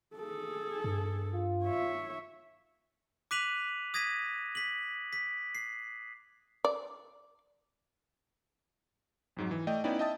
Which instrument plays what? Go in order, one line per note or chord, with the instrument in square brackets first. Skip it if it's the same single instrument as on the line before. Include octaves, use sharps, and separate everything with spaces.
[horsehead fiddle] G#4 A4
[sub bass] G2
[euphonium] F4
[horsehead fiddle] C#5 E5
[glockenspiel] D6 F#6 B6 D#7 F7 F#7
D#6 G#6 A#6 B6 D#7
B6 F#7
B6
C7
[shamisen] D5
[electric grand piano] F2 G#2 F#3
E3
A3 D5 D#5 G5
B3 C#4 D#4 E4 D5 G5
D#5 E5 G5 A5 D#6 A6